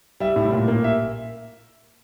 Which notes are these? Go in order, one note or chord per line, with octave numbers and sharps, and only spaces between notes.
G3 E5
A2
A#2
A#3
E5